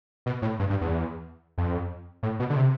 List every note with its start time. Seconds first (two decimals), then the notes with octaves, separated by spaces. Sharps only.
0.26 B2
0.42 A2
0.59 G2
0.70 G2
0.81 E2
1.58 F2
2.23 A2
2.40 B2
2.50 D3
2.56 C3